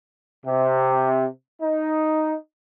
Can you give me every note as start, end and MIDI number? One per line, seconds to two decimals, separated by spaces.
0.45 1.25 48
1.61 2.34 63